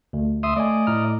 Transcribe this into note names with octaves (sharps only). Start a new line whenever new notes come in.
D2
E5 C6 D#6
A3 D5 D#5 G#5
A2 A#5 F6